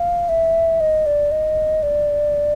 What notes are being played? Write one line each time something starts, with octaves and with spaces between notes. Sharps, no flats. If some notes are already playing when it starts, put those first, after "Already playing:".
Already playing: F5
E5
D#5
D5
D#5
D5